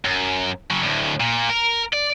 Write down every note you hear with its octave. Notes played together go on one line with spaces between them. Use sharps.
F#2
C#3 F#3
D2 A2
A#2
A#4
D5